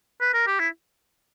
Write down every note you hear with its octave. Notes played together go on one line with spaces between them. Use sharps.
B4
A#4
G4
E4